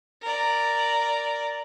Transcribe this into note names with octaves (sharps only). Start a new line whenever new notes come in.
A#4 D5